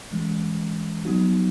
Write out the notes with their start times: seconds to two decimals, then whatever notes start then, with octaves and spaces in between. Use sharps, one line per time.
0.12 E3 G#3 C#4
1.05 F#3 B3 D#4 F#4